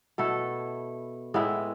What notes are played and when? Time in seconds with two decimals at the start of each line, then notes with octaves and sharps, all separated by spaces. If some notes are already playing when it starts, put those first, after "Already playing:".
0.18 B2 A3 E4 A4
1.34 A2 G#3 B3 E4